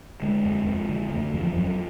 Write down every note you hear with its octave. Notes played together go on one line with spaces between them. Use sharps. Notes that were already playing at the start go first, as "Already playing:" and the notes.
D3 G#3
F2
F2
D3
D3 A3
F2 F3
F3
F2 F#3